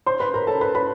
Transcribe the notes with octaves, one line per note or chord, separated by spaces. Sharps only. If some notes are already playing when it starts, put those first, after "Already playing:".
C5 C6
B4 B5
A#4 A#5
A4 A5
B4 B5
B4 B5